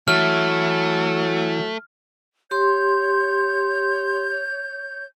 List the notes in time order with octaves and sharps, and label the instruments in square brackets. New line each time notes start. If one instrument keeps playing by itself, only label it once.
[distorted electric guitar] E3 [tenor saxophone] F#3 [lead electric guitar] A3 [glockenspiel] F6
[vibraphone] G4 C6 [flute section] C#5 G6